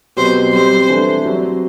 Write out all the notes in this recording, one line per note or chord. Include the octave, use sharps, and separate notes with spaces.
B2 F#3 C4 G4 C5
G3 C4 G4 C5
E3 A3 D4
F#3 C4 G4